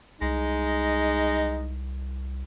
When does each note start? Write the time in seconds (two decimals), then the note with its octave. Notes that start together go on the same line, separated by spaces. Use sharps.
0.21 C2 G#3 D#4